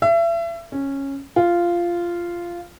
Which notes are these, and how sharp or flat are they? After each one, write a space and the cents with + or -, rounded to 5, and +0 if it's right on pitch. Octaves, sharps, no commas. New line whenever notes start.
E5 +35
C#4 -10
F4 -10